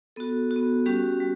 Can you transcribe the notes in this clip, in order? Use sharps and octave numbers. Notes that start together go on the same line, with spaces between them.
B3 F#4 A4
F#4
B3
G3 C#4 F#4 G4
G3